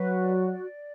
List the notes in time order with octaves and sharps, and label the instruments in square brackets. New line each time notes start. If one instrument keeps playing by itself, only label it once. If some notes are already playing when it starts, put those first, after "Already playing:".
Already playing: [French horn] F#3 [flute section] F#4 B4
[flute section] D5
D5